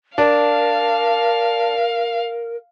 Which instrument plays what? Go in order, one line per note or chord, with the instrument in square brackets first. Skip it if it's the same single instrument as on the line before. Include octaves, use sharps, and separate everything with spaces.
[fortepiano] D4 [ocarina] A#4 [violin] F5 [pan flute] A5